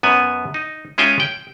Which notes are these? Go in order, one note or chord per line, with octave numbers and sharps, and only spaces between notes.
F#2 B3 G#5
D#4
G#3 C#4 F4 E5 G5 G#5
G5